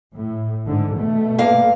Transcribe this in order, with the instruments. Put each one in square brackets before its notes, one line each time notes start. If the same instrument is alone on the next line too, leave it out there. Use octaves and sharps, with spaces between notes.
[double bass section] A2
G#2 D3
B2 A3
[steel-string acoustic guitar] G2 A#3 F5